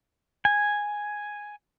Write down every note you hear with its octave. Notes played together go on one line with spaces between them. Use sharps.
G#5